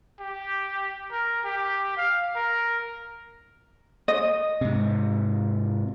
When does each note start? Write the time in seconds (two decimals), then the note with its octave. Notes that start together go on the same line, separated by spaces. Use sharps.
0.20 G4
1.11 A#4
1.45 G4
1.97 F5
2.36 A#4
4.08 D#5
4.61 G#2 C3